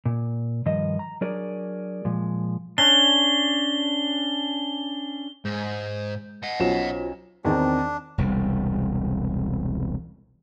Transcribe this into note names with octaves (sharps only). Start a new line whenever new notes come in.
A#2
G2 D#3 F3 D#5
A#5
F#3 D4 F#4 G#4 A#4 D5
A#2 F3 G#3
C#4 D4 G7
G#2 G#3 G6
D#5 F#5
B1 C#4 F4 F#4 C5 E7
E2 D#3 C4 D4
E1 C2 G3